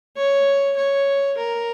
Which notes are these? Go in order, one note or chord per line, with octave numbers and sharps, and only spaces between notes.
C#5
C#5
A#4